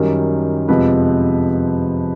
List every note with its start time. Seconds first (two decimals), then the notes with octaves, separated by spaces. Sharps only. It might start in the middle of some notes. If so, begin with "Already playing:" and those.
Already playing: F#2 D#3 G3
0.68 F2 C3 F3 G#3 B3 B4